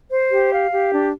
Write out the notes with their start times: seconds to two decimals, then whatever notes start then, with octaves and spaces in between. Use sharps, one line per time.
0.10 C5
0.31 G4
0.51 F5
0.71 G4
0.92 D4